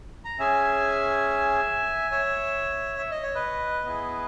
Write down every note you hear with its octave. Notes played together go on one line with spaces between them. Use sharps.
A#5
C#4 G#4 E5 G#5
C#5 E5
E5
D#5
C#5
B4 D#5
B3 E4 G#4